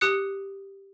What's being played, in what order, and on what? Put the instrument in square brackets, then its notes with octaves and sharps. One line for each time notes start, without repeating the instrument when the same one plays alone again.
[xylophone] G4 D#6 F#6 C#7